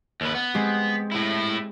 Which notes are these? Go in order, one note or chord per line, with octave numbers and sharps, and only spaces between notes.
D#2 B4
B3
G#3 C4 G4
A2 E4